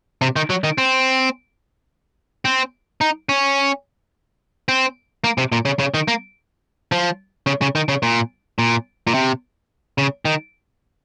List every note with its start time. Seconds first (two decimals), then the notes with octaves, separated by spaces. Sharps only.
0.22 C3
0.36 D#3
0.50 F#3
0.64 D#3
0.78 C4
2.45 C4
3.01 D#4
3.29 C#4
4.69 C4
5.24 A#3
5.38 C3
5.52 A#2
5.65 C#3
5.79 C#3
5.94 D#3
6.08 A#3
6.92 F3
7.47 C#3
7.61 C#3
7.75 D#3
7.89 C#3
8.03 A#2
8.59 A#2
9.07 A#2
9.14 C3
9.98 C#3
10.25 D#3